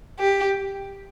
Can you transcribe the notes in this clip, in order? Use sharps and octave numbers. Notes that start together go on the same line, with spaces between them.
G4